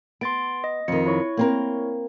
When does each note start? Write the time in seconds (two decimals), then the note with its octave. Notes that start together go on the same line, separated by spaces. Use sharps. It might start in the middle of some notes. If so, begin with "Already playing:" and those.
0.21 B3 C6 A6 D7
0.64 D#5
0.88 F2 D#3 C#7
1.06 E4 C#5 C#6
1.37 A#3 C4 A#4